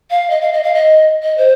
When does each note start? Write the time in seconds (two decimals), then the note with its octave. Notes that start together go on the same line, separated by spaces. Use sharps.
0.10 F5
0.30 D#5
0.41 F5
0.52 D#5
0.63 F5
0.74 D#5
1.23 D#5
1.38 C5